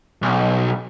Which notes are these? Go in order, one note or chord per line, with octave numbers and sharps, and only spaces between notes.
B1